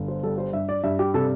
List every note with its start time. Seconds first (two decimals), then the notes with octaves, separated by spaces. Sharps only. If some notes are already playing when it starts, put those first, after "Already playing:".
Already playing: G1
0.08 C5
0.23 G3 A4
0.38 C5
0.53 G2 E5
0.69 D5
0.84 G2 E5
0.99 G4
1.14 C3 A4